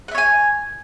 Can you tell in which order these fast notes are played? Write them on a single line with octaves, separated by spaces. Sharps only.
F#5 E5 C#5 G#5